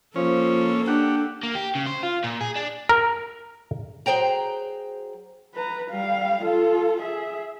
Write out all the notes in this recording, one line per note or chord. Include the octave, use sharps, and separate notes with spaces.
F3 A#3 C#4 A4
D4 G4 F#5
A#3
G4
C#3
C5
F4
A#2
G#4
D4
A#4
F#3 G#4 C5 G5 A#5
B4 A#5
G3 F5
F4 A4
G#4 E5